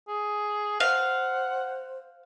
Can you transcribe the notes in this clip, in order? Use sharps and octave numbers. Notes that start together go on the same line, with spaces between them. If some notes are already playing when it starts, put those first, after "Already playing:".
G#4
C5 F5 F#5